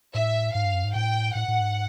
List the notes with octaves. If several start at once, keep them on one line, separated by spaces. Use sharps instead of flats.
A2 E5
G#2 F5
G2
F#2
G#2
A2 G5
A2 F#5
A2
G#2